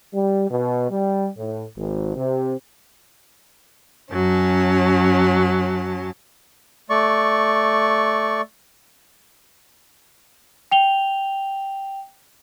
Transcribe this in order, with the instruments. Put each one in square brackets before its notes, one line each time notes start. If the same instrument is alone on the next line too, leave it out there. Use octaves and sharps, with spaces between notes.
[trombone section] G3
B2
G3
A2
G#1
C3
[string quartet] F#2 F#3 C#4 A5
[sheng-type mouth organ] A3 D5 C#6
[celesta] G5 F7 G7